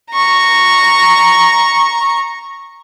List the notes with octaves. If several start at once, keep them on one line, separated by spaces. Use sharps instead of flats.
A#5 C#6